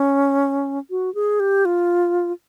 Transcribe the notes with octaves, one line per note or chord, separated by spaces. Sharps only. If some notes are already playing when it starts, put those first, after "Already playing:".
Already playing: C#4
F#4
G#4
G4
F4